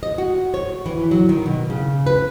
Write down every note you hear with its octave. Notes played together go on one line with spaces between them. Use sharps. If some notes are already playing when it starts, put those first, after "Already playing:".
D#5
F#4
C#5
E3
F#3
D#3
B2
C#3
B4